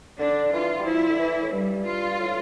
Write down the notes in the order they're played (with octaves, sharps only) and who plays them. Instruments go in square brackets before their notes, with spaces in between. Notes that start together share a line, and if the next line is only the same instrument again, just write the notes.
[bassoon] D3 [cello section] D4
[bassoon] E3 [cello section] F4
[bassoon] G3
[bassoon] F3 [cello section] E4
[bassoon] D3
E3
A2
[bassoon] G2 [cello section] G3
[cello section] F4
[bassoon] A2